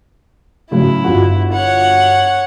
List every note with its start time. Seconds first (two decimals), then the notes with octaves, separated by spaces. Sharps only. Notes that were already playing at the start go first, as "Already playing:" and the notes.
0.71 A2 C#3 F#3 E4
1.04 G1 F4 F#4
1.53 C#5 F#5